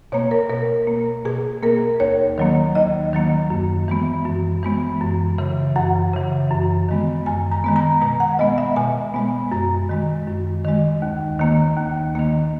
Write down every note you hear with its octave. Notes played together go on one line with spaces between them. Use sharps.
B2 A#3 C#5
A#4
B2 A#4
A#3
B2 G#4
A#3 A#4
D#2 C#5
D#3 F#3 A#3
D#2 D#5
D#3 F#3 A#3
F#2
E3 G#3 B3
F#2
E3 G#3 B3
F#2
C#3 E3
F#2 F#5
C#3 E3
F#2
D#3 G#3 B3
F#2 G#5
A#5
D#3 G#3 B3
A#5
B2 A#5
F#5
G#3 B3 D#5
E5
B2 G#5
G#3 B3
F#2 A#5
D#3 G#3
F#2
D#3 G#3
D#2
D#3 A#3
D#2
D#3 A#3